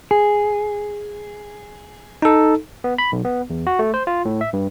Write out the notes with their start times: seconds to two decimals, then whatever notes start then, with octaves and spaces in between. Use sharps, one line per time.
0.11 G#4
2.22 D#4 A4
2.84 B3
2.98 B5
3.12 B1
3.25 B3
3.50 E2
3.67 F#4
3.79 A3
3.94 C5
4.07 F4
4.25 A2
4.41 E5
4.53 G2